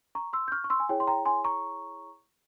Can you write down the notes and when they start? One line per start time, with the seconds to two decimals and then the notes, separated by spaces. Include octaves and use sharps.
0.15 A#5 C#6
0.33 C6 E6
0.48 G6
0.52 C#6 F6
0.64 C#6
0.70 C6 E6
0.80 G#5
0.89 E4 G#4 C#5 G5
1.00 C6
1.07 G5 A#5
1.25 G#5 C6
1.45 A#5 C#6